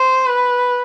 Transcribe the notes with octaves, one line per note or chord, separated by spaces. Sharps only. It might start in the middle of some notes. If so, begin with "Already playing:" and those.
Already playing: C5
B4